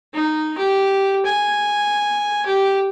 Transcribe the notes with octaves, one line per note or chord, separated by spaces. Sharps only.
D#4
G4
G#5
G4